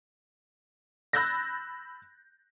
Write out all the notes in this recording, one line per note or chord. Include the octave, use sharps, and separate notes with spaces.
B5 E6 F#6 G6 A6 A#6